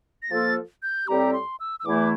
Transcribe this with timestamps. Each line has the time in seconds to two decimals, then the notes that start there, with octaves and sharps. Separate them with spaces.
0.22 A#6
0.30 F3 A#3 F4 A4 A6
0.83 G6
1.07 A2 G3 C4 G4 A#5
1.33 C6
1.60 E6
1.80 E6
1.85 E2 E3 A3 E4 D6